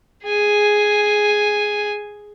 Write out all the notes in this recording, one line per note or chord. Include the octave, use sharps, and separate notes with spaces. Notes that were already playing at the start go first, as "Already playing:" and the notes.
G#4 G#5